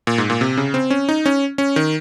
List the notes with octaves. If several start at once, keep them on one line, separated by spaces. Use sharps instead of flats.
A#2
G#2
A#2
C3
C#3
C4
C#4
D#4
C#4
C#4
D#3